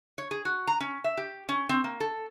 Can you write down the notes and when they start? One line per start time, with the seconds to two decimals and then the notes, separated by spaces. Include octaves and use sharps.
0.18 C#5
0.31 G#4
0.45 F#4
0.67 A#5
0.80 C#4
1.04 E5
1.17 G4
1.49 C#4
1.69 C4
1.84 A#3
2.00 A4